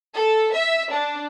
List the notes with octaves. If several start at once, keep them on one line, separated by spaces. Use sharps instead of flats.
A4
E5
D4